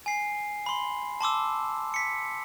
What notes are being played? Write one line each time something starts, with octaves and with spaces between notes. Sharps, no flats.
G#5 C7
B5 C6
A5 C6 D6 E6
B6 C#7